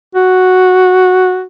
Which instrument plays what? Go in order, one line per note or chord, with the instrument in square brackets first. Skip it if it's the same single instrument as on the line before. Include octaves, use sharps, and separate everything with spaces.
[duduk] F#4